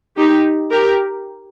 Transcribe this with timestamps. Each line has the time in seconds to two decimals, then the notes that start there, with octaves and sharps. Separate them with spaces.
0.17 D#4 G4
0.71 G4 A#4